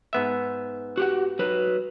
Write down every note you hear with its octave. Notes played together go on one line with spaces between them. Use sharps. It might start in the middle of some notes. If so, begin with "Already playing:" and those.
G#2 B3 E5
F#4 G4 F#5
F#3 B4